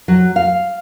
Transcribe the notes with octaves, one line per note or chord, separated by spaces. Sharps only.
F#3
F5